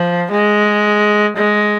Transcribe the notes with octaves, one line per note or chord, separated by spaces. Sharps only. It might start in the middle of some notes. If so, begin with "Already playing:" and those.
Already playing: F3
G#3
G#3